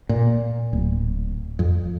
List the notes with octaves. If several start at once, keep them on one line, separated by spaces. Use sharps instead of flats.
A#2
D1
F2